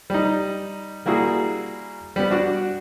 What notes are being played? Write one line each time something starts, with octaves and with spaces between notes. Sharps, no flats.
G3 D#4
G3 A#3 E4 F#4 G#4
G3 B3
D4 F#4 D5 F#5